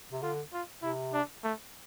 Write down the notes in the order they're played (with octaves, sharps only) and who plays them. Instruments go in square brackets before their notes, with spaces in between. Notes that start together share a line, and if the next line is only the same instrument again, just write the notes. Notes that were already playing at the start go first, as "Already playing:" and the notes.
[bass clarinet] C3
[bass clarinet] D3 [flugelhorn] F4
[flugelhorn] F4
[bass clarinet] C3 [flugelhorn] E4
[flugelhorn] D4
A3